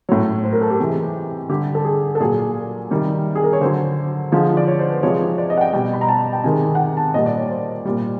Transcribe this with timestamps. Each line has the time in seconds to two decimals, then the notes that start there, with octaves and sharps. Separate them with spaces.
0.09 A2 F#3 C#5
0.44 C5
0.53 A#4
0.61 A4
0.70 G4
0.80 C3 E3 G#3
1.49 D3 G3 G4
1.75 A4
1.85 G#4
2.15 A4
2.20 A#2 F#3 G#4
2.90 C3 D#3 G3
3.35 G#4
3.44 A#4
3.53 C#5
3.61 D3 F#3 C5
4.32 D3 F3 G#3
4.57 D5
4.68 C#5
4.79 C5
4.91 B4
5.03 C3 F3 G#3 C#5
5.38 D5
5.50 D#5
5.57 F#5
5.61 G5
5.73 B2 G3 G5
5.93 B5
6.01 A#5
6.09 A5
6.33 G5
6.44 C3 D#3 G#3 G#5
6.75 F#5
6.79 G5
6.97 A5
7.14 A#2 G3 D#5
7.26 D5
7.38 C#5
7.50 C5
7.85 A#2 G3